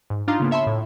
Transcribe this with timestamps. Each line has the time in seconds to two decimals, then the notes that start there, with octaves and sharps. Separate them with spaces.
0.10 G#2
0.28 D4 D#4 F4 F5 A#5 C6
0.40 C#3 A#3 B3
0.51 C#5 E5 A5 B5 C6
0.67 A2